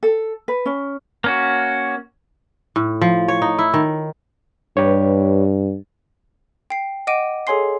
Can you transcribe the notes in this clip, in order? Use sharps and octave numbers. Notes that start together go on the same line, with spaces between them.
A4
B4
C#4
A#3 C#4 F#4
A2
F3
C#5
D#4
E4
D#3
G2 G4 B4 C#5
G5 C7
D#5 F#5 D6 D7 D#7
G#4 A4 C#5 G#5 C6 C7